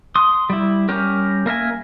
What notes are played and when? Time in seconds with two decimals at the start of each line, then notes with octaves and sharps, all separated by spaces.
0.15 C6 D#6
0.50 G3 E4
0.89 G3 C#4 G4 A#4
1.46 A#3 A#4 E5 G#5